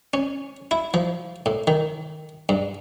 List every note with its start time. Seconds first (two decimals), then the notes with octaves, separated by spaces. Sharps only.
0.14 C#4
0.71 E4
0.94 F3
1.46 A2
1.67 D#3
2.49 G2